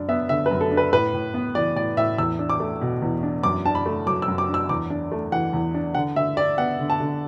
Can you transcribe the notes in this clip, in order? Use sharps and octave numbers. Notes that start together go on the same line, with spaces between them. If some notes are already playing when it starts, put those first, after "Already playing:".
Already playing: F#2 D4
B3 E5
D3 E5
B4
F#2
A4
D4
B4
A2 B4
A2
B3
E3 D5
A2 D5
A2 E5
E2 E6
D4
D6
A3
B2
E2
D4
F#2 D6
D4 A5
B5
A3
F#3 D6
E6
F#2
D6
D4
E6
E2 D6
D4
A3
E3 F#5
E2
D4
D3 F#5
D3 E5
D4 D5
B3 F#5
D3
A5
D3